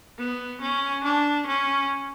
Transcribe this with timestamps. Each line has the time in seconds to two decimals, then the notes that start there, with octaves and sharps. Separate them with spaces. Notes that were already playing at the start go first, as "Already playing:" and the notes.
0.18 B3
0.62 C#4
1.04 D4
1.47 C#4